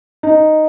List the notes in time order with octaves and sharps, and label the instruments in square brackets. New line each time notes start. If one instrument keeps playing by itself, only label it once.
[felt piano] D#4